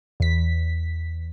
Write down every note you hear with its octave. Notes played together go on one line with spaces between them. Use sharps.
E2 B6